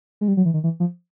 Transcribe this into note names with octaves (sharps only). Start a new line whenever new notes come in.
G#3
G3
F#3
E3
D#3
E3
F3